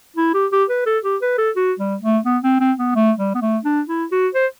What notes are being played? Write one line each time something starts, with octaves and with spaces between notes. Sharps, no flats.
E4
G4
G4
B4
A4
G4
B4
A4
F#4
G3
A3
B3
C4
C4
B3
A3
G3
B3
A3
D4
E4
F#4
C5